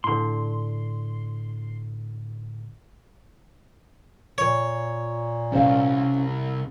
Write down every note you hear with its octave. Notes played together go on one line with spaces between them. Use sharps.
A2 D3 C6
A#2 C#5
C2 C#4 C5 F5